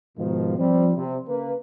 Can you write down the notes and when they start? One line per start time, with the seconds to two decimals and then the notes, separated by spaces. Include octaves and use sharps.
0.18 G#2 B2 D#3 F3
0.58 F3 G3 C4
0.97 C3
1.27 C#3 A#3 B4